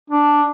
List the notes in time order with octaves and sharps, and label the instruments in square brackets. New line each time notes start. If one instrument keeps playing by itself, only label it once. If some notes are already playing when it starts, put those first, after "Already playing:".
[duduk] D4